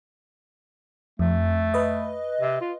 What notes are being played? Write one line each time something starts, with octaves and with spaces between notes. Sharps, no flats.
F2 A3
B4 D#5
C3
F4